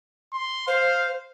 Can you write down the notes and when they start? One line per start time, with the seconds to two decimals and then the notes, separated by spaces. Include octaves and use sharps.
0.33 C6
0.67 C5 F5